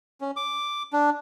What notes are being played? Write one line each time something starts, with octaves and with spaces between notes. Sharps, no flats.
C#4
D6
D4